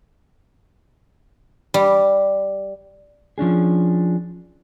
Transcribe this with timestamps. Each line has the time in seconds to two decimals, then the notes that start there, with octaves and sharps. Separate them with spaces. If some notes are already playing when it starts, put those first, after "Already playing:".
1.74 G3
3.38 F3 C#4 D4 G#4